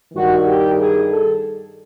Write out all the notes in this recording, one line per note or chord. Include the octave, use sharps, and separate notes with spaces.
G2 D#3 G3 F#4
G4
G#4
A4